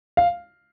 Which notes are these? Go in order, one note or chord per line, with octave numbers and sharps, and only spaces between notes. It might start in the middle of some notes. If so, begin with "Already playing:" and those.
F5